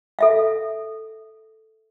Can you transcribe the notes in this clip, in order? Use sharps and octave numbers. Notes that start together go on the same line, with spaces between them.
A4 E5 F5